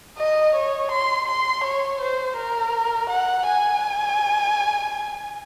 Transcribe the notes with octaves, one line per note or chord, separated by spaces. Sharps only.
D#5
C#5
C6
C6
C#5
C5
A#4
F#5
G#5